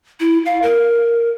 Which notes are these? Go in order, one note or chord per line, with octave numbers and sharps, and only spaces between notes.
E4
F5
A#4